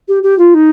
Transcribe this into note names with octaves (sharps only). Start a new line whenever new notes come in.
G4
G4
F4
D#4